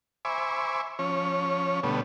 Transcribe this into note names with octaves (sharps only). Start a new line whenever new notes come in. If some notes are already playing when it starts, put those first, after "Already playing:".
C5 E5 G#5 B5 C#6 D6
F3 C#4 C#5
B2 D3 G3 A3 B3